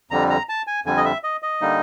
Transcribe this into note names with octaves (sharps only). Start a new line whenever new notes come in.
F2 D3 G3 A#5
A#5
A5
G#5
F2 D3 G3 G#5
D#5
E5
D#5
D#5
D3 G3 A#3 D#4